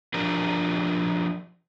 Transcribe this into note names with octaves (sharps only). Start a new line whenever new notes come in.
F3 D4 G4 A#4